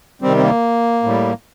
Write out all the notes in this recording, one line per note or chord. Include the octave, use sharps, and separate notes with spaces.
C3 D#3 G3 C4
C4
A#3
A2 G3